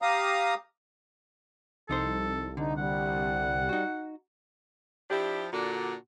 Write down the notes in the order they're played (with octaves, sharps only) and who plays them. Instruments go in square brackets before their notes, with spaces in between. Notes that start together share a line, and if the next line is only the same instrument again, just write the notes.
[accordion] G4 F5 A#5 D#6
[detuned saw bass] C2 [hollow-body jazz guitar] F3 D#4 C5 [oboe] A4
[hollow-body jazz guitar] D3 [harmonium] D#4
[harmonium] G3 [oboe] F#5
[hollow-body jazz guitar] D#4 F#4
[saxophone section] F3 D4 E4 G4
A#2 D3 D4 F#4